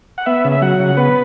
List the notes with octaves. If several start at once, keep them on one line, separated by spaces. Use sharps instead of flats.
F#5
B3 E5
C#3
E5
F#3 F#5
C#3
B3 B4